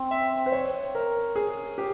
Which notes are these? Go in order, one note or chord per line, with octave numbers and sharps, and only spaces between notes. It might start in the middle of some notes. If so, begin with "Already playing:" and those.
Already playing: C4
E5
C5
C#5
A#4
G#4
G4